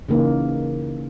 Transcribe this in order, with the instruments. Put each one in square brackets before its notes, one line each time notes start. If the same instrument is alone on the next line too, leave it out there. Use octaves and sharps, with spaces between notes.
[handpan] C#3 E3 A#3 D#4